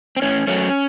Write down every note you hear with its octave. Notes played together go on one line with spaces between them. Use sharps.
C4
A2 C#4
F#3 A3 C#4